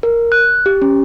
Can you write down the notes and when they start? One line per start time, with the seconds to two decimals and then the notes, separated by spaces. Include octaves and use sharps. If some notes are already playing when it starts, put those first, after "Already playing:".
0.03 A#4
0.32 F#6
0.66 G4
0.82 C#4